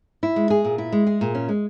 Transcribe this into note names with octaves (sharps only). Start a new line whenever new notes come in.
E4
G#3
G#4
A#2
E4
G#3
G#4
A#2
C#4
G#3